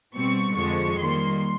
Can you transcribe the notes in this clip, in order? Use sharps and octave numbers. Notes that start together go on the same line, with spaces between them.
B2 G3 C4 C#6
F2 D3 F3 G#3 C#6
D#3 G3 A#3 C6